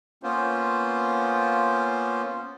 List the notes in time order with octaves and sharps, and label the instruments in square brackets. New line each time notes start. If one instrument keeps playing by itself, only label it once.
[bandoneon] A#3 B3 C#4 F4 C5